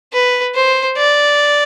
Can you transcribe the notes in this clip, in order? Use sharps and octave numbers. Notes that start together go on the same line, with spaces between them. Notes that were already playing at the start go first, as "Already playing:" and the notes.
B4
C5
D5